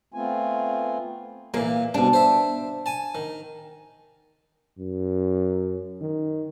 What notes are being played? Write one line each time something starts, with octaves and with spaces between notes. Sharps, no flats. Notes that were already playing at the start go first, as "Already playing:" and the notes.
A3 B3 C4 F4 G#5
A#2 E3 A#3
C2 B2 D4
C5 E5
G#5 A5
D#3
F#2
D#3